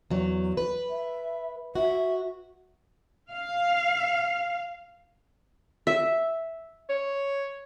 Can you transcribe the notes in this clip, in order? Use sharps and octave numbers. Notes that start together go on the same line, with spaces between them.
E2 F#3
B4
E5
F#4 E5
F5
E5
C#5